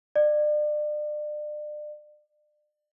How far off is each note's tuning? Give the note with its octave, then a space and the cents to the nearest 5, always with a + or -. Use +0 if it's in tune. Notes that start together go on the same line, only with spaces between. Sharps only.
D5 +35